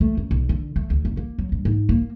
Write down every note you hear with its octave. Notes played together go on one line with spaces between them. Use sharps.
A3
F#2
B1
D3
A3
D2
F#1
A#3
F#3
G2
G#2
A#3